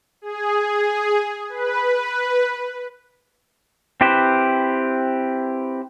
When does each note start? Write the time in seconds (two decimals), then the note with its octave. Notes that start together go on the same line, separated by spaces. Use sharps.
0.22 G#4
1.49 B4
4.01 C4 E4 G4 B4 C5